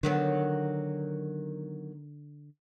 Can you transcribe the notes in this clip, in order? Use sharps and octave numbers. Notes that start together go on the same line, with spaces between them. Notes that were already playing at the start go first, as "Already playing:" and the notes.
D3 D#3 F#3 B3